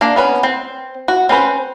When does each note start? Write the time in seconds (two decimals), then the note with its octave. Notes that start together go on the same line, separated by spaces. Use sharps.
0.01 A#3 D4
0.16 B3 C#4 B4
0.43 C4
1.08 F#4
1.29 C4 C#4 B4 C5